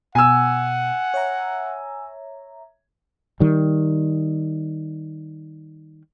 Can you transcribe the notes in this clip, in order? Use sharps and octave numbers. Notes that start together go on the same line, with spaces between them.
B2 F#5 G#5 E6
C#5 E5 A#5
D#3 G3